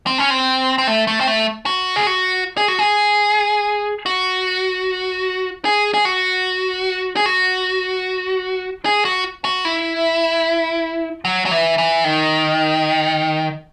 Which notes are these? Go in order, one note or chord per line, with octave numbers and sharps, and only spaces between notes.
C4
C#4
C4
C4
A3
A3
C4
A3
F#4
G#4
F#4
G#4
F#4
G#4
F#4
G#4
G#4
F#4
G#4
F#4
G#4
F#4
F#4
E4
F#3
F#3
E3
E3
D#3